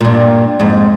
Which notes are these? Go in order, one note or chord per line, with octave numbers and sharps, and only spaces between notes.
G2 A#2
F2 G#2